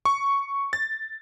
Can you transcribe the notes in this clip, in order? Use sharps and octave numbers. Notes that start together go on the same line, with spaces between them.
C#6
A6